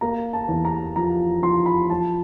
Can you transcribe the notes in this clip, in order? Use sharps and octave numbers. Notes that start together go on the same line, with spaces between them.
A#3 A#5
A5
E2
A#5
F3 A#5
F3 C6
B5
F3 A5